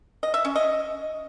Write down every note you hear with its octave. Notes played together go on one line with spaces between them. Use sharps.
D#5
E5
C#4
D#5